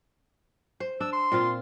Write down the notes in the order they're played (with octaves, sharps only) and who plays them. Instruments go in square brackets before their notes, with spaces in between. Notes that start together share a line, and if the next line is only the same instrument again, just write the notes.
[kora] C5
[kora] D4 [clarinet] E6
[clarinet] C6
[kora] A#2 C4 F4